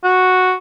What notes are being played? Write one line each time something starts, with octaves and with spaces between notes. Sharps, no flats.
F#4